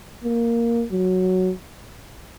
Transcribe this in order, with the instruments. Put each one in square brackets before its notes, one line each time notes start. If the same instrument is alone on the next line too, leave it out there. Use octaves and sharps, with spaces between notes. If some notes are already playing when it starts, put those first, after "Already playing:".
[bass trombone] A#3
F#3